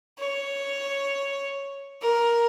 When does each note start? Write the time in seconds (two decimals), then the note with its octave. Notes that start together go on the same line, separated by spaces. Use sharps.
0.19 C#5
2.01 A#4